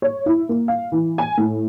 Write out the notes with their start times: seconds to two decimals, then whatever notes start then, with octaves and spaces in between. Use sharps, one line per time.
0.02 C#5
0.26 E4
0.49 A#3
0.68 F5
0.92 E3
1.18 G#5
1.38 A2